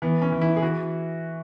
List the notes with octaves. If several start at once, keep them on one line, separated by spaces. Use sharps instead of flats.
E3 B3
C#4
E3
E4
G#4
E3 F#4